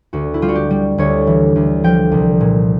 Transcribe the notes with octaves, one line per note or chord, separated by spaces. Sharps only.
D2 F#4
E4
G3 F4
F#4
G4
G3
D2 C#5
E3
D2
F3 G5
C2
A#2